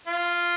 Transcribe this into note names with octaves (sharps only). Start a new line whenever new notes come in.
F4